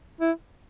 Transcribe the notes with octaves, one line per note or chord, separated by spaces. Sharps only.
E4